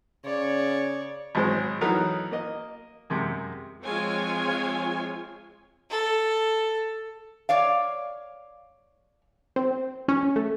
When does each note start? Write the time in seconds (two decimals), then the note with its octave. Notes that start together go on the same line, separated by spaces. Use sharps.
0.25 C#3 C#5 D5
1.35 G#1 F#3 G#3 C5
1.81 E3 F#3 B3 D#4 A4 A#4
2.31 A#3 D#5
3.10 F#2 C3 G#3
3.82 F3 G#3 C4 F4 C#5 G#5
5.90 A4
7.49 C#5 D5 F5
9.56 C4
10.08 C#4
10.36 A3